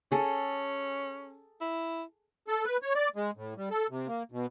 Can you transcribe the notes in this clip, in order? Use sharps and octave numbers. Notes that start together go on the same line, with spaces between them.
C#4 G#4 A4
E4
A4
B4
C#5
D5
G#3
A2
G3
A4
C3
A#3
B2